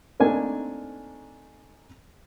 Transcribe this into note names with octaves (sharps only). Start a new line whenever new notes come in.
A3 A#3 C4 D4 D#4 G#5